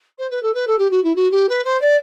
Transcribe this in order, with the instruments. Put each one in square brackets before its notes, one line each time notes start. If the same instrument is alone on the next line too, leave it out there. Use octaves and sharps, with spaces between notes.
[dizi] C5
B4
A4
B4
A4
G4
F#4
E4
F#4
G4
B4
C5
D5